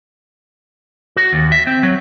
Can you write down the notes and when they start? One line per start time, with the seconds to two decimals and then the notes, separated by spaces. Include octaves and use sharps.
1.16 F#4
1.33 D#2
1.52 E5
1.67 C4
1.83 F#3